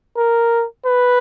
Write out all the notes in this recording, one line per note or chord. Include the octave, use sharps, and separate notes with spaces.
A#4
B4